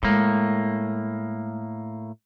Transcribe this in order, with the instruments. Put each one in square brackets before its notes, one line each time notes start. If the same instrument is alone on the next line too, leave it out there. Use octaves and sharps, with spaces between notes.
[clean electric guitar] A2 A#3 [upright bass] G#3